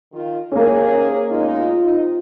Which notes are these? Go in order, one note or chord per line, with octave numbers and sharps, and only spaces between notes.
D#3 F4
D#2 C3 A#3 C#4 G#4
B2 G#3 D#4 F4
C3 D#4